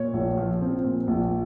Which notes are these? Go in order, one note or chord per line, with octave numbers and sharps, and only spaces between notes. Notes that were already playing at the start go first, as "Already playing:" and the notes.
Already playing: A#2 C#5
A#1
F3
C4
A#2
A#1